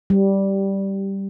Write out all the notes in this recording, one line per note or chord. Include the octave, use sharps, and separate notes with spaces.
G3